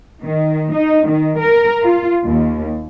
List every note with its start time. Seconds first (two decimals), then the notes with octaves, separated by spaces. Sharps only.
0.23 D#3
0.73 D#4
1.08 D#3
1.40 A#4
1.83 F4
2.24 D#2